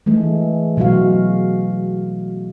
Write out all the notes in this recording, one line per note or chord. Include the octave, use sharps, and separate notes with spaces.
E3 G#3 A3
B2 F#3 G#3 F#4 F5